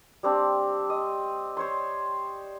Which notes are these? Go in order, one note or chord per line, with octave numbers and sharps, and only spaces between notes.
G3 C4 D4
D#5
C5 C#5 C6